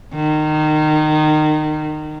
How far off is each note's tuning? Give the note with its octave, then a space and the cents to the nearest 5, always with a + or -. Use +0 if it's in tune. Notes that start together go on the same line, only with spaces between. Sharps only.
D#3 -25